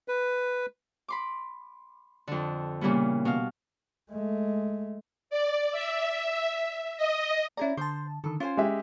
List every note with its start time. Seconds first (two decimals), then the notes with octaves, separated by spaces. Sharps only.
0.08 B4
1.08 B5 C6 D6
2.27 F2 D3
2.81 A#2 C#3 E3 G3 B3
3.25 B2 F5
4.10 G#3 A3
5.30 D5
5.72 E5
6.97 D#5
7.57 C#4 E4 G#4 D5 A#5
7.77 D3 C5 A5 C6
8.24 D3 D#3 A4
8.40 C#4 F4 C5 G#5
8.57 G#3 G4 E5